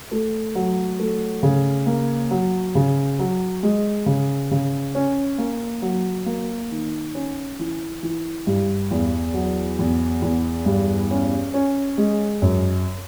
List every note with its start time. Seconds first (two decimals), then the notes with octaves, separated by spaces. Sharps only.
0.11 A3
0.55 F#3
0.99 A3
1.43 C#3
1.86 A#3
2.31 F#3
2.75 C#3
3.19 F#3
3.63 G#3
4.06 C#3
4.51 C#3
4.95 C#4
5.38 A#3
5.82 F#3
6.26 A#3
6.71 D#3
7.15 C#4
7.59 E3
8.03 E3
8.47 G2
8.91 E2
9.34 F#3
9.79 E2
10.22 E2
10.66 G2
11.11 C#4
11.54 C#4
11.98 G#3
12.42 F#2